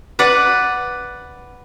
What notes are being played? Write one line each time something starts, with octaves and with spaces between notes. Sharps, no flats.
B4 D5 F#5